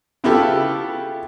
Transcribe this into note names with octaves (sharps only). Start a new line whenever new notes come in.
C#3 B3 E4 F4 G4 A4